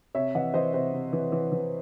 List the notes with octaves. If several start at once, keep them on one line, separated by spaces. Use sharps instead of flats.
C3 C#5 E5
E3 D#5 F#5
E3 C5 D#5
C3 C5
C3
E3
E3
E3